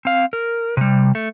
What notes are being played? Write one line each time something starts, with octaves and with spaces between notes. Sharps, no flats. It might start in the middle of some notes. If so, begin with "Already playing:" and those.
C4 F5
A#4
C3 G3
A3